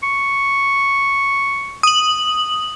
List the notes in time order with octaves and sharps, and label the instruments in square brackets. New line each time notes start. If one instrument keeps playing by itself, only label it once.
[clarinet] C#6
[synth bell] D#6 F#7